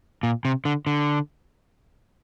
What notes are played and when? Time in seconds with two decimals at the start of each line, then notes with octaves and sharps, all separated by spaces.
0.23 A#2
0.45 C3
0.65 D3
0.87 D3